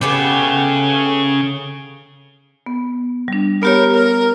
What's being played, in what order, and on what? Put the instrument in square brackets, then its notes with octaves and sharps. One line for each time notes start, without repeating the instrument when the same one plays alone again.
[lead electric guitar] C#3 G#4 [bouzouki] A3 B3 G4
[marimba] B3
G3 D4
[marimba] B3 G4 C#5 [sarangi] A#4
[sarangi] A#4